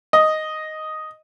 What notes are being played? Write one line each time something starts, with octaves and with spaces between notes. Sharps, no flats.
D#5